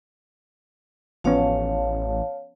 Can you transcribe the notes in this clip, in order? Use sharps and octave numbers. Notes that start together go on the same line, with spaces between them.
A1 F3 B3 C#4 C#5 F5 A5